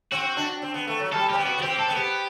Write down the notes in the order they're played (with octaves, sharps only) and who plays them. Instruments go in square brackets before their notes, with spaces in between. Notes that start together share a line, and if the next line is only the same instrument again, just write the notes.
[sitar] C4 [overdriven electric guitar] F#4
[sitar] D4
C4
B3
A3
F#3
[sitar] G3 [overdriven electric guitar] A4
[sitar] C4 [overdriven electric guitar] G4
[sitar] B3
[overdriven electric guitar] F#4
[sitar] B3
[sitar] C4 [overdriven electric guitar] G4
[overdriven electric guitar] A4
[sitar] B3
[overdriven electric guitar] G4